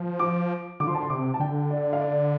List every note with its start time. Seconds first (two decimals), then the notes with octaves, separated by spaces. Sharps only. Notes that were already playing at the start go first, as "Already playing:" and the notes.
Already playing: F3
0.19 D6
0.80 D3 D6
0.87 F3 C6
0.95 D3 A5
1.01 C6
1.10 C3 D6
1.34 A5
1.40 D3 G5
1.70 D5
1.93 F5
2.01 D5